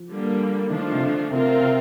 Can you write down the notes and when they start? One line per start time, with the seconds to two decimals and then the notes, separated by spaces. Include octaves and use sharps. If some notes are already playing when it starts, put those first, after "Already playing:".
Already playing: F3
0.10 D3 G3 A#3
0.70 D#3 F3 A3 D4 F4
0.92 C3
1.01 D3
1.30 C3 C4 F4 A#4
1.60 C3